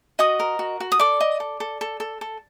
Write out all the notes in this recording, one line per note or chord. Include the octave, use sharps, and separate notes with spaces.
F#4 D#5 D#6
A#4
F#4
F#4
D#6
A4 D5 D6
D#5
A4
A4
A4
A4
A4